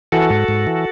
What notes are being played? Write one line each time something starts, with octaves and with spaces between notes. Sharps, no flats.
E3 F#4 A4
G#2
G#2
E3